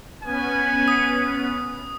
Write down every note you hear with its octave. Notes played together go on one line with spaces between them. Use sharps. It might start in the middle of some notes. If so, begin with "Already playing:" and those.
B3 C#4 B4 G#5
D#6